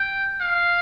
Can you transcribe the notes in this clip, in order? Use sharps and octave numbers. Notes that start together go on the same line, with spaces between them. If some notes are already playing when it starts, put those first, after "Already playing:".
Already playing: G5
F5